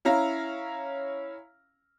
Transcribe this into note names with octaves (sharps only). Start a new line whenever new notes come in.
C#4 E4 F5 A#5